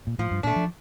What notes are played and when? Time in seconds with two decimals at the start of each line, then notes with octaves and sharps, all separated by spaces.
0.07 A#2
0.19 A2 F3
0.31 G2
0.43 A#2 A3 D4
0.56 F3